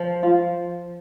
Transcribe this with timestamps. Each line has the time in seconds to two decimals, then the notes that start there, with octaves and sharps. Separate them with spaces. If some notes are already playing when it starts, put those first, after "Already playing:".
Already playing: F3
0.23 F4